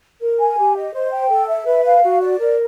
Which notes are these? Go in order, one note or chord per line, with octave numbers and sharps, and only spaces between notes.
A#4
G#5
G4
D#5
C5
G5
A4
E5
B4
F5
F#4
D5
A#4